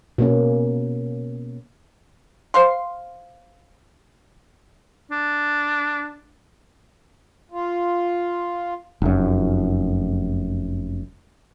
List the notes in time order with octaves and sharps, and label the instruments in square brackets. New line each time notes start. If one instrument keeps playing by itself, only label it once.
[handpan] B2 A#3 C#4
[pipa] C5 F5 C6
[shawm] D4
[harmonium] F4
[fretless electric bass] F1 F#2